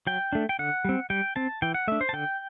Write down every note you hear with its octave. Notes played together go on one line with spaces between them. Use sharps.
F#3 G5
A3 D4
G5
D3 F#5
G3 C4
G3 G5
C4 A5
E3 G5
F#5
A3 D4 E5
C5
A5
D3 G5